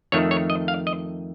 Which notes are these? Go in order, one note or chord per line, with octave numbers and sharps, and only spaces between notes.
F2 D#3 A3 C#5
C#5
D#5
F5
D#5